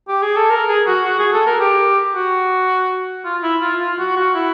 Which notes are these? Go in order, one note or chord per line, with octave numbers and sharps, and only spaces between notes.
G4
G#4
A4
A#4
G#4
F#4
F#4
G#4
A4
A#4
G4
F#4
F4
E4
F4
F4
F#4
F#4
E4